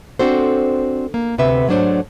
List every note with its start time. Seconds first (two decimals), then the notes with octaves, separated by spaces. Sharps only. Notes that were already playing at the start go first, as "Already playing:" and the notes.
0.19 C4 D4 F#4 A4 C5
1.14 A#3
1.38 D2 C3 B3 B4 E5
1.68 G#2 F#3 A3 D4 C5 C#5